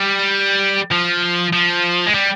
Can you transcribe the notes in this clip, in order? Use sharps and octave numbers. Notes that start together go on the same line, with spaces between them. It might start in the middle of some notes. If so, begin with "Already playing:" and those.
Already playing: G3
F3
F3
G#3
G3